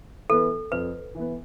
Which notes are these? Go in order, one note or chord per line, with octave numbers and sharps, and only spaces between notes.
E3 B3 A4
F2 B4
E3 B3